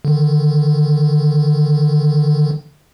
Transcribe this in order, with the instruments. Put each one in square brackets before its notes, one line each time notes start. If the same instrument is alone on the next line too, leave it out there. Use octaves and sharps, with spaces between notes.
[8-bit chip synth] D3 D#3